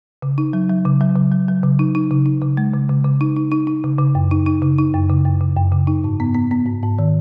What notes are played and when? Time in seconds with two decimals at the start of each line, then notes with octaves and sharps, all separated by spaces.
0.22 C#3
0.38 D#4
0.53 F#3
0.70 F#3
0.85 C#3
1.01 F#3
1.16 C#3
1.32 F#3
1.48 F#3
1.63 C#3
1.79 D#4
1.95 D#4
2.11 C#3
2.26 D#4
2.42 C#3
2.57 G#3
2.74 C#3
2.89 C#3
3.04 C#3
3.21 D#4
3.36 D#4
3.52 D#4
3.67 D#4
3.84 C#3
3.99 C#3
4.15 F#2
4.31 D#4
4.46 D#4
4.62 C#3
4.78 D#4
4.94 F#2
5.09 C#3
5.25 F#2
5.41 C#3
5.57 F#2
5.72 C#3
5.87 D#4
6.04 G#2
6.20 B3
6.34 B3
6.51 B3
6.66 G#2
6.83 G#2
6.98 D#3